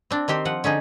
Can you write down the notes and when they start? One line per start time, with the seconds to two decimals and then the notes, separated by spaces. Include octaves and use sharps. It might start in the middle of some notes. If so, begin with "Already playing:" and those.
0.11 C4 D4
0.28 D#3 C4 G4 C5
0.45 F3 F#5
0.64 D3 C#4 D#4 G#4